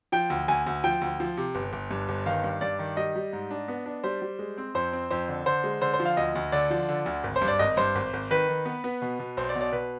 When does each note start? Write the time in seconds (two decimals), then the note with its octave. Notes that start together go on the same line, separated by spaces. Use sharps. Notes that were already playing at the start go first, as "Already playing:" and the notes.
0.12 F3 G5
0.30 D2
0.48 D2 G#5
0.66 D2
0.84 F3 G5
1.01 D2
1.20 F3
1.37 C3
1.55 G1
1.73 G1
1.91 G2
2.09 G1
2.26 D#3 F5
2.44 G2
2.61 G2 D5
2.79 D#3
2.97 G3 D#5
3.16 G3
3.33 G#2
3.51 D4
3.68 B3
3.86 D4
4.04 G3 C5
4.22 G3
4.39 G#3
4.58 C4
4.75 F2 C5
4.93 C4
5.10 F2 C5
5.28 D3
5.46 D3 C5
5.64 G#3
5.81 D3 C5
5.94 C5
6.00 F3
6.05 F5
6.17 D2 D#5
6.35 D2
6.52 D3 D5
6.70 F3
6.89 D3
7.06 D2
7.24 G#1
7.36 C5
7.42 G2
7.48 D5
7.59 G#1 D#5
7.77 G2 C5
7.95 G#1
8.13 G#1
8.30 D#3 B4
8.49 D#3
8.66 B3
8.84 B3
9.02 B2
9.19 B2
9.37 B1 C5
9.49 D5
9.55 B2
9.61 D5
9.72 B2 B4